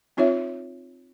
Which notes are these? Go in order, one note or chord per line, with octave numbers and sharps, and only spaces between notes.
C4 D#4 F4 C#5 E5